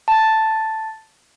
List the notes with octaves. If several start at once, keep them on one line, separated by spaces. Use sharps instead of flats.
A5 A6